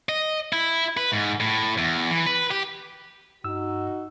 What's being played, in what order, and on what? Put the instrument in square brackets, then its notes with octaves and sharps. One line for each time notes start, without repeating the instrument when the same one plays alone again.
[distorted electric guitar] D#5
E4
B4
G#2
A2
E2
E3
B4
G4
[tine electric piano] G2 E6 [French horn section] D#4 F#4